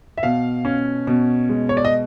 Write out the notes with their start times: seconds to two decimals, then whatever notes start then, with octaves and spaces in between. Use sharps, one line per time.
0.17 E5
0.23 B2 F5
0.65 C#4
1.07 B2
1.49 G#3
1.69 C#5
1.77 D5
1.85 D#5